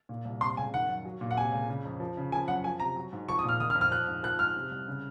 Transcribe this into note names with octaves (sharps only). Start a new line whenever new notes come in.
A#2
C2
C3 C6
C#2 G#5
D#3 F#5
F#2
F#3
A#2
F#5
C3 G#5
C#2
C#3
F2
F3
C#3
F3 G#5
F#2 F#5
F3 G#5
C3 A#5
F#3
G#2
F3 C#6
D#6
A#2 F6
D#3 D#6
F6
F2
F6
F3 F#6
G#2
F3 F#6
G#2 F6
C3
C2
C#3